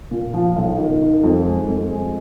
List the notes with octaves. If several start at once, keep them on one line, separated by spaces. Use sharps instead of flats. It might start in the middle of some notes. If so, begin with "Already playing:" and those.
A#2
F3
B1
D#3
D#3
F2
G#3
F2
G#3